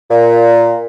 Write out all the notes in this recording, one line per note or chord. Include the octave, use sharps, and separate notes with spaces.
A#2